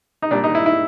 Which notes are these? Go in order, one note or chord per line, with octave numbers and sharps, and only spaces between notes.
D#4
A#2 G3 D4
D#4
E4
E4